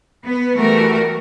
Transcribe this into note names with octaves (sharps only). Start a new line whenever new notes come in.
B3 B4
E3 G3 A3 F#4 A#4